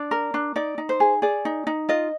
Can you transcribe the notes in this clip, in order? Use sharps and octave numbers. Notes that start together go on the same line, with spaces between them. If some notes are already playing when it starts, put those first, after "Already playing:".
Already playing: D4 D5
A#4
D4
D#4 D5
D#4
C5
G#4
G#4 D5
D#4
D#4
F4 D#5